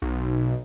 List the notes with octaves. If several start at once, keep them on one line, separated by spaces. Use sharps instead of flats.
B1